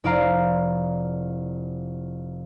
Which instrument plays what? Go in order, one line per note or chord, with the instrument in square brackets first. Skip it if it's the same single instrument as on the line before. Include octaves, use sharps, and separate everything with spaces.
[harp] F1 E4 D5 F5 A#5 C7